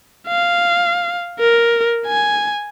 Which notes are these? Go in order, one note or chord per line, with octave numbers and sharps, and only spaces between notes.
F5
A#4
G#5